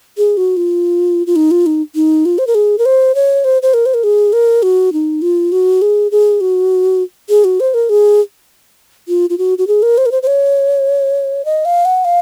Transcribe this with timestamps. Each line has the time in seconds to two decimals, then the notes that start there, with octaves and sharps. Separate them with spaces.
0.18 G#4
0.37 F#4
0.57 F4
1.27 F4
1.36 D#4
1.51 F4
1.66 D#4
1.95 D#4
2.25 F4
2.38 C5
2.47 A#4
2.55 G#4
2.78 A#4
2.85 C5
3.15 C#5
3.44 C5
3.62 C5
3.74 A#4
3.86 C5
3.94 A#4
4.04 G#4
4.33 A#4
4.63 F#4
4.93 D#4
5.22 F4
5.52 F#4
5.82 G#4
6.12 G#4
6.41 F#4
7.29 G#4
7.44 F#4
7.60 C5
7.74 A#4
7.89 G#4
9.08 F4
9.30 F4
9.38 F#4
9.58 F#4
9.67 G#4
9.83 A#4
9.98 C5
10.06 A#4
10.12 C5
10.23 C5
10.27 C#5
11.45 D#5
11.65 F5
11.85 F#5
12.05 F5